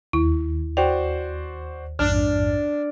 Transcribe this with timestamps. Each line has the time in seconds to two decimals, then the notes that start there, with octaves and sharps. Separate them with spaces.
0.13 D#2 E4
0.77 F#4 C5 D5 G5
1.99 A#1 F2 G#2 D4 F6